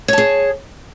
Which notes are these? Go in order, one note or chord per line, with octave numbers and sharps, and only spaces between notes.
G#4 C#5 A5